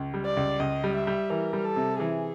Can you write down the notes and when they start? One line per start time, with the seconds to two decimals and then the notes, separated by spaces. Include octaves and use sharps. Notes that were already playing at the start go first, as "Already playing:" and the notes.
Already playing: C#2
0.14 G3
0.25 D5
0.37 C#2
0.60 C#2 D#5
0.84 G3
0.95 E5
1.07 G3
1.30 E3 A#4
1.53 G3
1.65 A4
1.76 C3
2.00 E3 G#4